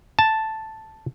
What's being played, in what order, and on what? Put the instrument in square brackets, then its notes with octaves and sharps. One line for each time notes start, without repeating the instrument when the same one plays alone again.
[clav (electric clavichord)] A5